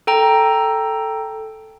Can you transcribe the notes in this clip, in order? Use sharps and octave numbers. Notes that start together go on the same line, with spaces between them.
A4 G5 A#5